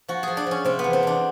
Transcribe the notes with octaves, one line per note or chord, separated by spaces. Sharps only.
F3 F#4
F3 G#4
D4
F3 C#4
C3 C4
B3
E2
C4
E2 D4